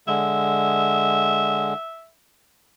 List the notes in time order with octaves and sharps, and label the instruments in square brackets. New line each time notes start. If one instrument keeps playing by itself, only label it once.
[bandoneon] D3 G#3 [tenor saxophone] E5